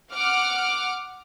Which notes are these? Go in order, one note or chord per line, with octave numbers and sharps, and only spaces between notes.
F#5 D6 F6